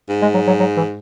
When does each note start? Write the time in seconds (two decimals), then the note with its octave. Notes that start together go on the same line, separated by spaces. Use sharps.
0.09 G#2
0.22 G#3
0.34 F#3
0.47 F#3
0.59 F#3
0.77 E3